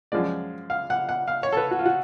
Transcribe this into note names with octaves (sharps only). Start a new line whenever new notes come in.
F#2 F3 G#3 D5
F5
F#5
F#5
F5
C#5
A4
B4
F#4
F4
F#4